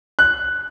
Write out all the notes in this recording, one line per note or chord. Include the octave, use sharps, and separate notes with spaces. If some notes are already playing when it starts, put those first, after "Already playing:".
F#6